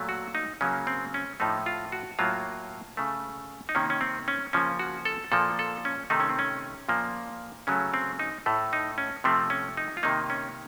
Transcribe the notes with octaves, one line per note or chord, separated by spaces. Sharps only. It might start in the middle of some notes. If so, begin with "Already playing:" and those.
Already playing: A#2 F#3 A3
F#4
D#4
C#3 F#3 A#3 C#4
C4
C#4
A2 F3 A3 D#4
F4
F#4
A2 F#3 A#3 F4
C#3 A3
D#4
C3 D#3 A#3 C#4
C#4
C4
C#4
C#3 F3 A#3 C#4
F#4
A4
A#2 F3 A#3 A4
A4
C#4
C3 D#3 A3 D#4
C#4
C4
C#4
A#2 F3 A#3
C#3 F#3 A3 C#4
C4
D#4
A2 A3
D#4
C#4
C3 F3 A3 C4
C#4
D#4
F4
C3 D#3 A#3 D#4
C#4